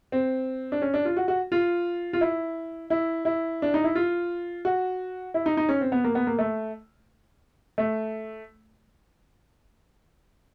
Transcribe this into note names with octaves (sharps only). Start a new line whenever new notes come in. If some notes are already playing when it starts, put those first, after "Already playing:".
C4
D4
C#4
D4
F4
F#4
F#4
F4
F4
E4
E4
E4
D4
D#4
E4
F4
F#4
E4
D#4
D#4
C#4
C4
B3
A#3
B3
A#3
A3
A3